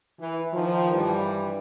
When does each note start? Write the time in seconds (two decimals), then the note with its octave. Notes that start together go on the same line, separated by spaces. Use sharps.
0.19 E3
0.53 D#3 F3
0.93 G2 E3 G3